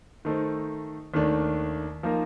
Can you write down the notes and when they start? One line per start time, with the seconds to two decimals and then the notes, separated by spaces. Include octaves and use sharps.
0.25 D#3 A3 D#4 A4 C5
1.14 D#2 D#3 A3 D4
2.03 F3 A#3 D#4 A#4